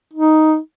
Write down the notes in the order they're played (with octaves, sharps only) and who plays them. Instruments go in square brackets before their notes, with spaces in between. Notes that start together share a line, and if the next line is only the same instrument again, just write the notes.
[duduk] D#4